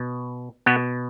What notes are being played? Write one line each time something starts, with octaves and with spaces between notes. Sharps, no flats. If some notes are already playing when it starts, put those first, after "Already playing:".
Already playing: B2
B2 B3